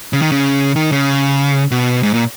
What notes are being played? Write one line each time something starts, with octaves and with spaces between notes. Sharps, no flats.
C#3
D#3
C#3
D#3
C#3
B2
G#2
A#2